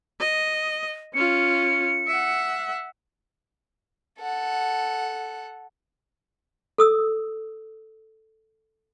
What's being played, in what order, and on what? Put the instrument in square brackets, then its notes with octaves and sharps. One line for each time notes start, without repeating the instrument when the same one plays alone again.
[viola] D#5
[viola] C#4 F4 [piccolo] C#7
[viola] E5 F#5
[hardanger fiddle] A4 F#5
[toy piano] A4 D#6 E6